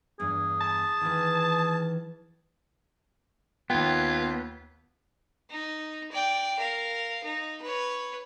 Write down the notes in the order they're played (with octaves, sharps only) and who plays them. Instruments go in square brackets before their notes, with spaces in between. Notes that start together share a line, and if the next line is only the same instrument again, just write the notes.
[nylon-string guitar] E2 G2 [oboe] G#4
[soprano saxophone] A5
[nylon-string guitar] D#3 E3
[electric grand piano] D#2 G5 [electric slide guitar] B3 [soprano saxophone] F4 [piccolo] G#6
[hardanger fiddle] D#4
D5 G5
A#4 F5
D#4
B4 C#5